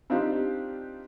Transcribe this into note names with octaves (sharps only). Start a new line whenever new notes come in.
C4 D4 D#4 F4 G4